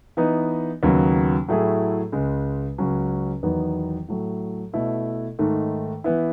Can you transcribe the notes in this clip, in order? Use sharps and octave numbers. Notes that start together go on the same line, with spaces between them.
E3 B3 D#4
D#2 C#3 F#3 B3
A2 F#3 A3 E4 G#4
C#2 C#3 G#3
C#2 C#3 F#3 C#4
E2 D#3 F#3 B3 D#4
A2 F#3 A3
B2 A3 E4 A4
G#2 D#3 A3
E3 B3 E4